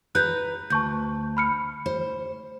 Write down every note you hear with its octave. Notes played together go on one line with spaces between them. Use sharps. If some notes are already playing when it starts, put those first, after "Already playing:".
B4 A#5 F#6 G6
D2 A5 C#6 G6
B5 F6 C#7
C5